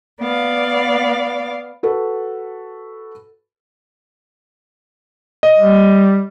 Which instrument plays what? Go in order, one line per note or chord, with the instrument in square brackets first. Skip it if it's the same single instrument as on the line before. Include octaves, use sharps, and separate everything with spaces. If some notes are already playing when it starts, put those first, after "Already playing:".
[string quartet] B3 D5 F5
[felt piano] F#4 A4 B4
[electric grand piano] D#5
[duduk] G3